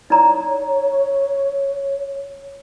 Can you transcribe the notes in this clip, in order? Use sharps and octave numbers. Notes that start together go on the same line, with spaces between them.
D#4 C#5 D5 A#5